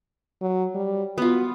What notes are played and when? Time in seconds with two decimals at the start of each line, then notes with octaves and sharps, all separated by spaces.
0.42 F#3
0.75 G3
1.18 B3 F4 F#4